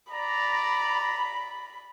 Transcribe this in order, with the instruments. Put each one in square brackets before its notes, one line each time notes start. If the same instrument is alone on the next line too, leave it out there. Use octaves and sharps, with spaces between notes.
[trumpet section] D5 A#5 [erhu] B5